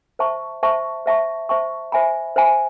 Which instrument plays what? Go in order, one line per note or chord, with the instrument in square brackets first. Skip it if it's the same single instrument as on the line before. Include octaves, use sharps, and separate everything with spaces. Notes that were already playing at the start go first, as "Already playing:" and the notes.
[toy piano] C5 E5 A5 C#6
C5 E5 A5 C#6
C5 E5 A5 C#6
C5 E5 A5 C#6
C5 E5 G#5 B5
C5 E5 G#5 B5